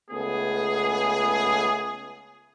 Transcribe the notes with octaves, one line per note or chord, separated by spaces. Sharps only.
C#2 A3 B3 G#4